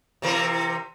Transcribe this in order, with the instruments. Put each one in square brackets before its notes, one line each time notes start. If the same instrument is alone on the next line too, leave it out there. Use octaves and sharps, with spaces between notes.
[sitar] C3 E3 A#4